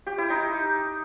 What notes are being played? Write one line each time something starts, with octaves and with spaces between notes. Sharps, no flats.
G4
E4
D#4